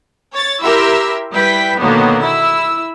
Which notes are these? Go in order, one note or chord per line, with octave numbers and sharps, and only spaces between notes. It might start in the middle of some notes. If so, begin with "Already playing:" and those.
C#5 A6
E4 G4 A#4 E5 C6 E6
G3 E4 B4 G5 B6
B2 D3 D#3 F#3 A#3 B3
E4 E6